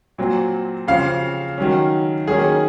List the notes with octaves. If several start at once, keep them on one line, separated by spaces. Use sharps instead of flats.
A#2 F#3 C4
C#3 F3 C4 F5
D#3 F#3 C#4
D#3 F#3 A#3 C#4 G#4